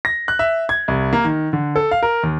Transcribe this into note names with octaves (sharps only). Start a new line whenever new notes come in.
A#6
F#6
E5
G#6
C2
A#3
D#3
D3
A4
F5
A#4
D#2